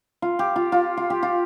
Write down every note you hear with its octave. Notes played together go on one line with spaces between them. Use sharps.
F4
G4
F4
F4
F4
G4
F4